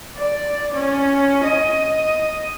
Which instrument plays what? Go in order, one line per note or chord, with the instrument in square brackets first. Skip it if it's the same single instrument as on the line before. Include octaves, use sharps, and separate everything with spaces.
[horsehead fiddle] D5
C#4
D#5